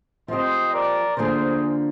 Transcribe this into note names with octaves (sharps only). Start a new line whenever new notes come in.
F3 C4 G4 C5 D#5
A#4 D5
D3 F3 A#3 D4 G#4 C5